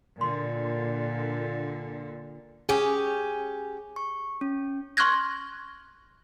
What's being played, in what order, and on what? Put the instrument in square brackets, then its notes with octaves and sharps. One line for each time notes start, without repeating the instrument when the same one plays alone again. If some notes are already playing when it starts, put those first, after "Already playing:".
[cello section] A#2 D3 [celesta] C6
[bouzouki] C#4 G4 [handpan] G#4
[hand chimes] C#6
C#4
[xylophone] C6 C#6 F6 F#6 G#6 A#6